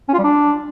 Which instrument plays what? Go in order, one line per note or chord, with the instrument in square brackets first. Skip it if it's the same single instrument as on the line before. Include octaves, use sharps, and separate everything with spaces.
[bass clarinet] C#4
F4
G3
D4